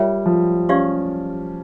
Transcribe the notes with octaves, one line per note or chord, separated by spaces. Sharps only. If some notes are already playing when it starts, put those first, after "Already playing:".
Already playing: G3 F4 A#4 C#5 E5 G5
F3
C#4 G4 D5 F5 C#6